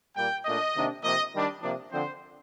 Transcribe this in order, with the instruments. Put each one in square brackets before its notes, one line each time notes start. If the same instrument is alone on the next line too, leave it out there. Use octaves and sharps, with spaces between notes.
[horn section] A#2 G3 A#3 G5
A#2 A3 D4 D#5
C3 D#3 A#3 D4
C3 F3 A#3 D#5
D#3 G3 D4
C3 F3 A#3 D4
D3 F3 C4 C5